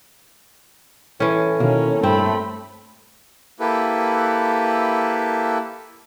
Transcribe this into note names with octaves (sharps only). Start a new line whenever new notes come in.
A2 E3 C#4
B2 D#3 A#3 C#4
G2 A3 C4 B5
A#3 E4 G4 A4 B4